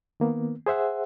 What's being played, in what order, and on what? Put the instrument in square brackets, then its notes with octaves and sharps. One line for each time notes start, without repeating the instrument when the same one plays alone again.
[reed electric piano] D#3 A#3 B3
G#4 C5 E5 F#5